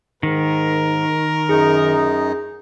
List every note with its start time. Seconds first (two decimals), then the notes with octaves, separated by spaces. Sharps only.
0.23 G#2 D#3 A#4
1.49 F#2 D#4 G#4